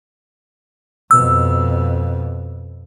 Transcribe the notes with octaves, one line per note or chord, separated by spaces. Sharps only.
F2 B2 E6